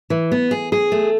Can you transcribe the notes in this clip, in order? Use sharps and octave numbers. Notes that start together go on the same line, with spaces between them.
E3
B3
G#4
G#4
A3